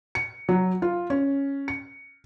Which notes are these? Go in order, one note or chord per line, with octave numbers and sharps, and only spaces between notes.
C#7
F#3
F4
C#4
C#7